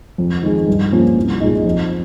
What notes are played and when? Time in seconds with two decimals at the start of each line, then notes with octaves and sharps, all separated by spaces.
0.18 F2
0.43 D#3 G#3
0.68 G2
0.92 F3 A#3 C#4 F4
1.17 C2
1.40 A#2 G#3 D#4
1.65 F2